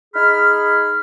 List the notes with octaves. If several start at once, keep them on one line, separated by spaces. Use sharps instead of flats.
D#4 G#4 B5 F6